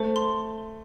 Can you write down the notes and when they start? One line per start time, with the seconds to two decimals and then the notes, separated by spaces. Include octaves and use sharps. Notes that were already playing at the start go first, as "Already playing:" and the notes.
Already playing: A3 C5
0.16 C6